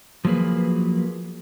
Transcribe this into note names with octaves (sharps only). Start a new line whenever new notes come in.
F3 F#3 A#3 G#4 B4